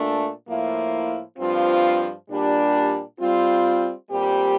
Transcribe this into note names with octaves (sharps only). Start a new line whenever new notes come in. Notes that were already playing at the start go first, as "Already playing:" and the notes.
Already playing: A#2 A3 D4
A2 F3 A#3 E4
G2 F3 C4 F4
A#2 G3 D4 G4
G3 C4 F4
A#2 G3 C4 G4